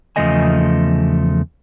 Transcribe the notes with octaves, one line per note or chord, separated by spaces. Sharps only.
E2 C#3 F3 A3 D#5 G#5